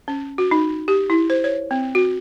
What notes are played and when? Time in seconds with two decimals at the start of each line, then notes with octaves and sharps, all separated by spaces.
0.08 C#4
0.38 F#4
0.51 D#4
0.88 G4
1.10 E4
1.30 C5
1.44 C#5
1.71 C4
1.95 F#4